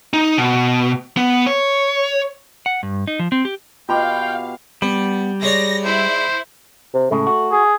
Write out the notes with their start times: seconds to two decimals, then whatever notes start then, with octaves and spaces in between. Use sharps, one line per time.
0.13 D#4
0.38 B2
1.17 B3
1.46 C#5
2.66 F#5
2.83 G2
3.07 D#4
3.19 F3
3.32 C4
3.45 G4
3.89 B2 F4 G4 F5 G5 B5 C6
4.82 G3 B3
5.42 G#3 C#5 D5 A#6
5.85 E4 C5
6.94 C3
7.11 A2 C#3 G#3 A3
7.27 F#4
7.52 G#4